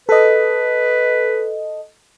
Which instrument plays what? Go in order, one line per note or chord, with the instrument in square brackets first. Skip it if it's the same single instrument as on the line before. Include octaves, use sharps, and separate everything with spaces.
[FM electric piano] A4 D#5 [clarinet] B4